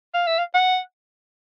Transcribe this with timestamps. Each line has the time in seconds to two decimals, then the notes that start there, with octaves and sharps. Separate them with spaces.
0.14 F5
0.27 E5
0.38 F5
0.54 F#5